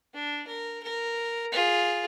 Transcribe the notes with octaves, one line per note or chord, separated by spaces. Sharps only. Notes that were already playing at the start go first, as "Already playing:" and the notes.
D4
A#4
A#4
F4 G#4